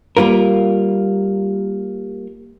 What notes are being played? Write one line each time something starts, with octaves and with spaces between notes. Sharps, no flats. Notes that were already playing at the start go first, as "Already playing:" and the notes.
G3 A#3 F4 A#4